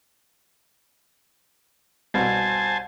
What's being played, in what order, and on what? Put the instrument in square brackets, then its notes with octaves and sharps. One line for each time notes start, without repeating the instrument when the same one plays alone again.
[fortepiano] C2 B2 [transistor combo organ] C5 G#5 A5